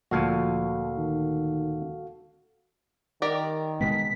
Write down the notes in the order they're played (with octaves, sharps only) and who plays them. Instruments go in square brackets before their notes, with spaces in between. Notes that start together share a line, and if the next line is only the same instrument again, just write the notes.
[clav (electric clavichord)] D2 A#2 [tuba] F3 [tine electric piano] F#4 A4 F5
[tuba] D#3
[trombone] D#3 [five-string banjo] G4 A#4 D5
[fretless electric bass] B2 G#3 B3 [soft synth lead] B6